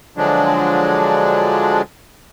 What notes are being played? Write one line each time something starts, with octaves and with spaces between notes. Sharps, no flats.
D3 F3 F#3 G#3 D4